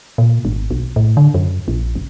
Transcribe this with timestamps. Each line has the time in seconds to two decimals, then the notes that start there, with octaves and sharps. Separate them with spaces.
0.18 A#2
0.45 G#1
0.71 B1
0.96 A2
1.17 D3
1.34 F#2
1.68 A#1
1.95 F#1